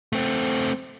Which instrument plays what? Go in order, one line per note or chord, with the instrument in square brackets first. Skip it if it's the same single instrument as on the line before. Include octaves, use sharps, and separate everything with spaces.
[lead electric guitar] A3 C4